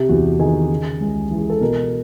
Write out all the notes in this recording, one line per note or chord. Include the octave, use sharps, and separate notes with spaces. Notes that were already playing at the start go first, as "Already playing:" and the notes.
Already playing: C3 G4
E2 F#4
D#3 G#4
C#3
C#2
E3
G#4
A4
B2 A#4